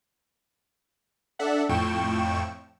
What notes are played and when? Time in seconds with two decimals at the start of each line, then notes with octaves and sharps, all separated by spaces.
1.39 D4 A4 E5 F#5
1.69 F2 A2 G5 C#6 E7